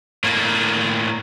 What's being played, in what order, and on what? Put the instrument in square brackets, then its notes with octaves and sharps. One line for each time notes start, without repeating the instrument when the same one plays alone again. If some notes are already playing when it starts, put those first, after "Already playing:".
[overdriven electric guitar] A2 A#3